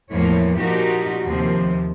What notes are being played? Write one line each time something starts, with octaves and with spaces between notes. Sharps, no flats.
E2 A2 E3 F3 A#3 C#5
A#2 F3 D#4 F#4 G4 A#4
D#2 C3 F3 A#3